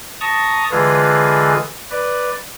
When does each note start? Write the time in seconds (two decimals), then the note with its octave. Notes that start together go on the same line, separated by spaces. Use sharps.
0.21 A5 A#5 C#6 D#6
0.71 D3 E3 G#3 F4 G#4 B4
1.91 B4 D5